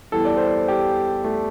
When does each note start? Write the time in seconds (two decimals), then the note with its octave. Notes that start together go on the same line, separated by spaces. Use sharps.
0.12 E2 E3 G3 A4
0.25 D5
0.37 C5
0.68 G4
1.24 A3